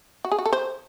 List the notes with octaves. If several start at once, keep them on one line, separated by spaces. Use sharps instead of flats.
F#4
G#4
F#4
A4
C5